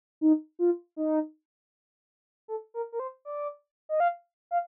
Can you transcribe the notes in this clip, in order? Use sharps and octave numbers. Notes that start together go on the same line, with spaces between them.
D#4
F4
D#4
A4
A#4
A#4
C5
D5
D#5
F5
F5